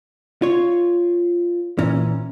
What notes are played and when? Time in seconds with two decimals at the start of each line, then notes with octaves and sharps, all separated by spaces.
0.42 F4 C#5
1.79 A#2 E3 C#4